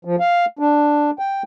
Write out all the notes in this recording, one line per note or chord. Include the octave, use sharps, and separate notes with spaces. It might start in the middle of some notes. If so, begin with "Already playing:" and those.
F3
F5
D4
G5